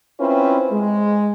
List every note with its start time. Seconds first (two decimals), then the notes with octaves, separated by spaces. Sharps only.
0.20 C4 C#4 E4 F4 B4 C5
0.72 G#3